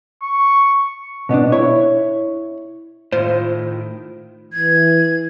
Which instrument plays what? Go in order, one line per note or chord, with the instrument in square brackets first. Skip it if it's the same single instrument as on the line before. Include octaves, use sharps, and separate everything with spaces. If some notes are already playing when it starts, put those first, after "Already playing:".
[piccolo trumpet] C#6
[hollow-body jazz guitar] B2 B3 C#4 D4
E4 C#5
[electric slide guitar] A2 D#3 [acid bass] F4 [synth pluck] C5
[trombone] E3 [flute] G#6